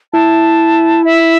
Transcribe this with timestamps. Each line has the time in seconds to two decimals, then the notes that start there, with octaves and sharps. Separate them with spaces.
0.13 E4 A5
1.05 E5